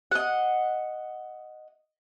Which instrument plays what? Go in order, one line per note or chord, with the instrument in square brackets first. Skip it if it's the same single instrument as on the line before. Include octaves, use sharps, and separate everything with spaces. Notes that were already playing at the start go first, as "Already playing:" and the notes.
[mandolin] D#5 F#5